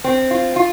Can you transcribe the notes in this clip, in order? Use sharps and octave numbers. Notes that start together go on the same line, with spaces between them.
C4
F4
F4